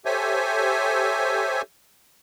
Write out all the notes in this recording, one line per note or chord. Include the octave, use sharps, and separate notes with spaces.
G4 A4 C5 C#5 E5 G#5